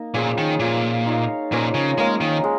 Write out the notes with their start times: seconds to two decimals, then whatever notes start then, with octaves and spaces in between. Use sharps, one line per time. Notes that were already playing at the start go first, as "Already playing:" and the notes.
Already playing: A#3 D#4 D#5
0.14 A#2 F3 C#4 G#4
0.38 D#3
0.60 A#2 F3 A#3 F4
1.06 D#4 C#5 F5
1.52 A#2 F3 C#4 A#4 D#5
1.74 C#3
1.98 G#3 A#3 C#4 A#4
2.21 D#3
2.44 G#3